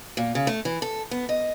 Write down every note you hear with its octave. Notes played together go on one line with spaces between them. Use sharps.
A#2
C#3
A3
E3
A4
B3
D#5